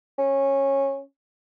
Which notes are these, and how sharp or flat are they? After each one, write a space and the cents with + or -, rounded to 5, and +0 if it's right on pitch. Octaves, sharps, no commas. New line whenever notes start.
C#4 -15